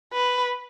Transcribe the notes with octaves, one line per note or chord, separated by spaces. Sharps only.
B4